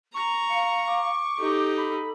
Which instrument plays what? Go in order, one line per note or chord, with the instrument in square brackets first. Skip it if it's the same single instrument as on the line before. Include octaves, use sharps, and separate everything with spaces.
[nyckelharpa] A#5 [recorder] C#6
[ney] F5 [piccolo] C#7
[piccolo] D6
[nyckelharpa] D#4 G4 [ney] A4
[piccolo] B5